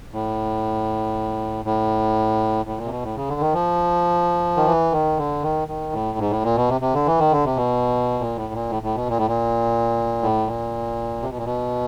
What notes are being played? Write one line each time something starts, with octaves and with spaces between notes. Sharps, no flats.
A2
A2
A2
A#2
C3
B2
A2
C#3
D3
D#3
F3
D#3
E3
D#3
D3
D#3
D#3
A2
G#2
A2
A#2
B2
C3
C3
D3
E3
D#3
D3
C3
B2
A#2
A2
A#2
A2
A2
B2
A#2
A2
A#2
A2
A#2
C3
B2
A#2
B2